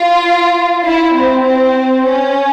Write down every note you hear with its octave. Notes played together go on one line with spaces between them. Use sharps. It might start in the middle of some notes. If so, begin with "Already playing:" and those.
Already playing: F4
E4
C4
C4
C#4